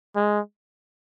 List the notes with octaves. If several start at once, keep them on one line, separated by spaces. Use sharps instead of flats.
G#3